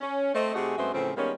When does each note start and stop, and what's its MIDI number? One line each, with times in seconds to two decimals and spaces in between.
0.01 0.30 61
0.34 0.52 57
0.34 0.52 60
0.34 0.52 75
0.55 0.75 48
0.55 0.75 57
0.55 0.75 63
0.55 0.75 66
0.55 0.75 68
0.78 0.93 42
0.78 0.93 56
0.78 0.93 57
0.78 0.93 59
0.78 0.93 60
0.78 0.93 72
0.94 1.12 45
0.94 1.12 49
0.94 1.12 52
0.94 1.12 53
0.94 1.12 60
1.17 1.32 51
1.17 1.32 55
1.17 1.32 56
1.17 1.32 58
1.17 1.32 59
1.17 1.32 61